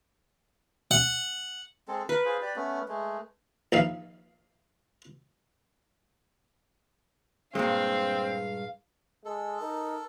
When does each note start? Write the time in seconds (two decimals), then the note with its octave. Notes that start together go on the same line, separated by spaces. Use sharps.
0.91 F#5
1.88 G#3 C4 A4
2.09 A#4 B4
2.25 F4 G#4 C5
2.42 G4 D5
2.56 A3 B3 C#4
2.88 G#3 A3
3.72 A#1 D#4 E5 F5
7.55 G2 A#2 G#3 C4 F5
9.25 G#3 A4
9.61 D#4 A#4